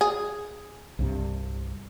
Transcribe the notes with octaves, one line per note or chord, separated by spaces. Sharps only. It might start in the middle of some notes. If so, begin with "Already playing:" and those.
G#4
C2 G2 C3